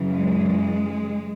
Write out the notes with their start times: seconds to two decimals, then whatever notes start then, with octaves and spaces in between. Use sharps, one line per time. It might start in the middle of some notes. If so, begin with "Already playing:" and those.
Already playing: F#2 C#3 E3
0.11 G#3